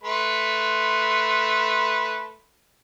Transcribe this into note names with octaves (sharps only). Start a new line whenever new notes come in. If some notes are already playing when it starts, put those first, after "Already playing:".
A3 B4 C6